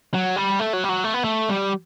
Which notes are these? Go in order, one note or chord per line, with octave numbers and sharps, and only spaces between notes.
F#3
G3
A3
F#3
G3
F#3
A3
B3
A3
G3